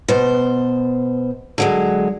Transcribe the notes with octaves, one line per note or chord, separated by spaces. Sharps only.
B2 C5
D3 F#3 G#3